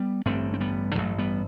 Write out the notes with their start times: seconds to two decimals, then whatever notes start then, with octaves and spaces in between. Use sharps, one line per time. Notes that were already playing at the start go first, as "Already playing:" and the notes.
Already playing: G3 B3
0.26 A1 G2 D3 A3 C4
0.54 C4
0.60 G3 B3
0.95 A1 G2 D3 F#3 A3
1.18 G3 B3